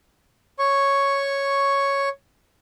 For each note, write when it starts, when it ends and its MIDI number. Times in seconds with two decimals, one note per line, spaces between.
0.59 2.09 73
0.59 2.09 85